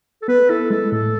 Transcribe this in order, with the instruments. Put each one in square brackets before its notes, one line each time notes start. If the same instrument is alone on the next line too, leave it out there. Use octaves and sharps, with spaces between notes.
[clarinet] A4
[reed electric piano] B3 [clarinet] B4
[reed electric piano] E4 [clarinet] A4
[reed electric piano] G#3 [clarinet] A4
[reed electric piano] A2 [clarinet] A4